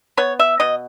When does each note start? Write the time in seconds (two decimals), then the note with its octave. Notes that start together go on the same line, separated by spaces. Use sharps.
0.17 B3 C#5
0.39 E5
0.60 B2 D#5